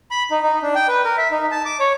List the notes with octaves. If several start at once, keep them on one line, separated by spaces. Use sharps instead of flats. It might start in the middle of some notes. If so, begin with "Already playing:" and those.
B5
D#4
D#4
D4
G5
B4
A#4
E5
D#4
A5
D6
C#5